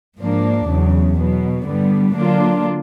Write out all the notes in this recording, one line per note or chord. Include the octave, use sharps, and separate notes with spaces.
G#2 F3 A#3 D4
E2 C#3 F#3
B2 F#3 B3
G2 D3 G3 B3
D3 F#3 A#3 D4 F4